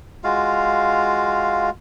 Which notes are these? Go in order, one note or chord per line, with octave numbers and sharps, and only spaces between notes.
G#3 F4 F#4 F5